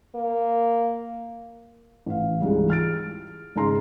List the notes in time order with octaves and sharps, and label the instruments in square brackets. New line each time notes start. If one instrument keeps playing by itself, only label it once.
[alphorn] A#3
[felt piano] A1 F5
C#2 G#2 E3 G3
F6 A6 D7
G#1 C#3 D#4 G#4 A#5 C6